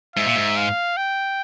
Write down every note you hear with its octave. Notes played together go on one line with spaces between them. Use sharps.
G#2 E5
A#2
G#2
F5
G5